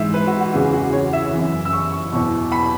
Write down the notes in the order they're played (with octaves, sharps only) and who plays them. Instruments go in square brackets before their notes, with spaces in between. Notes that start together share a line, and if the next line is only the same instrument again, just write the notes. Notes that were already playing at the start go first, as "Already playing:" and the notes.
Already playing: [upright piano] G#2 E3 E5
B4
F#4
F#4
E2 C#3 E3 G#4
G#4
F#4
G#4
C#5
E5
F#2 E3
E6
C#6
C#6
E2 B2 C#6
B5